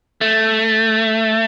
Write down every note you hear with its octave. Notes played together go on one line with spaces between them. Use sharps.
A3